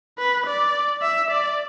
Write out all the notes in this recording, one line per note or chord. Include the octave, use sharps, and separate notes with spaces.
B4
D5
E5
D5